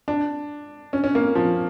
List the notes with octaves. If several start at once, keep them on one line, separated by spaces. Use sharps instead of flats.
D4
C#4
C#4
A#3
F3